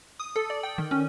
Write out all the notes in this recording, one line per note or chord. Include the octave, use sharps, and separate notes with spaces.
D#6
A4
D5
G5
D#3
C#4